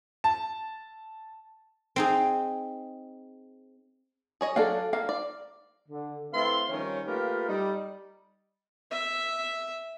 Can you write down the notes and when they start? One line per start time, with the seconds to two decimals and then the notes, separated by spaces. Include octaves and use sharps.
0.24 A5
1.96 C4 D#4 G#4
4.41 G#4 C#5 D#5
4.56 F#3 D4 A4 D5 F5
4.93 A#3 F5
5.09 D5
5.89 D3
6.32 A3 C4 E4 B4 F5 C6
6.69 D#3 F3 G3 C#4 C#5
7.06 A3 A#3 F4 G4 A#4 B4
7.48 G3 D#4
8.91 E5